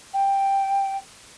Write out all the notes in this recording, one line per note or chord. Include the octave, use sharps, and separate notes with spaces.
G5